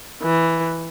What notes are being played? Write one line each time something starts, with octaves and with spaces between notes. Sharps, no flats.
E3